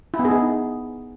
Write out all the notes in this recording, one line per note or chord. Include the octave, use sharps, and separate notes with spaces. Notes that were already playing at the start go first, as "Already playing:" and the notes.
E4
B3
G#4
D#4